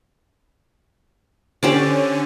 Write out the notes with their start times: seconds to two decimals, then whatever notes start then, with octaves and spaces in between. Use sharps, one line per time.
1.63 D3 C#4 G4 C5 D5